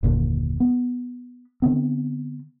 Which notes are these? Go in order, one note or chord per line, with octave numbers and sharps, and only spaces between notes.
F#1 D#2 A#2 D3
B3
D3 F3 B3 C4